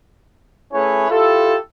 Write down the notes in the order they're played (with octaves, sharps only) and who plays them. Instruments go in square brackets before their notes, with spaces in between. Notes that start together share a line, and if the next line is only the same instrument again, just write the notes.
[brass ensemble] A3 C#4 E4 G#4 B4 C#5
E4 F4 G4 A4